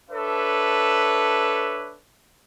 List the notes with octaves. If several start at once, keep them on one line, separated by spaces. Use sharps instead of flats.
D4 A4 B4 C#5 E5